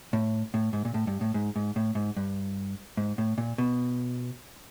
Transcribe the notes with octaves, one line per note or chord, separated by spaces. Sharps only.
A2
A2
G#2
A#2
A2
G2
A2
G#2
G#2
A2
G#2
G2
G#2
A2
A#2
B2